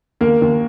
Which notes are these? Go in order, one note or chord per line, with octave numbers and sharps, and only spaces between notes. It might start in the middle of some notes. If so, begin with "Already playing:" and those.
D#2 A#3 A#4
D#2